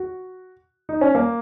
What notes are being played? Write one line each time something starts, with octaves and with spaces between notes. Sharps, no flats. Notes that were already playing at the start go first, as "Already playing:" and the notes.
Already playing: F#4
D#4
C#4
A#3